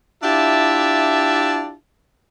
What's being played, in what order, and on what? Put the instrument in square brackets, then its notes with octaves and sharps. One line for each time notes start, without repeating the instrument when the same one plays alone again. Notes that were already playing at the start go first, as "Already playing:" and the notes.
[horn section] D4 E4 F4 G4 E5 A5